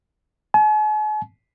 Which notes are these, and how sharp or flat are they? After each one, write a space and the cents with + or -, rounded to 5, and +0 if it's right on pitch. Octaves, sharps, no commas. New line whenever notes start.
G#5 +45